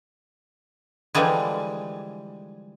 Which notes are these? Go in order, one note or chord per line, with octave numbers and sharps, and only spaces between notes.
D3 E3 F3 G3 G#3